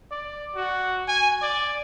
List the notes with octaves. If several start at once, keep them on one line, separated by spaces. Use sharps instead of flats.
D5
F#4
G#5
D5